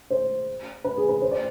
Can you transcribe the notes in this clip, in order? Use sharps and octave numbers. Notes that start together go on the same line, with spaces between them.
C5
B4
G#4
B4
C5
D5